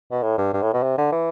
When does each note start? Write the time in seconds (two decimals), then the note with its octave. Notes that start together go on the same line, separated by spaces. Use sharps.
0.11 B2
0.23 A2
0.38 G2
0.53 G2
0.63 A2
0.73 B2
0.83 C3
0.98 D3
1.12 E3